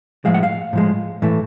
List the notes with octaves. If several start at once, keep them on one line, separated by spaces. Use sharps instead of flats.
A2 F3 G#3 F5
F#5
F5
A2 F3 G#3
A2 E3 A3